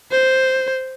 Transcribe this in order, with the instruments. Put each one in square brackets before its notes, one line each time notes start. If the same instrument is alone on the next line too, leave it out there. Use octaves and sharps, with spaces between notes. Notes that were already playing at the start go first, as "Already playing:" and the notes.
[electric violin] C5